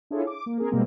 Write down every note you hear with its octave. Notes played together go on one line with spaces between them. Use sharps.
D4 E4 F4 G#4 A4 C#5
D6
A#3
C4 G#4 A#4
B2 G3 G#3 A#3 C4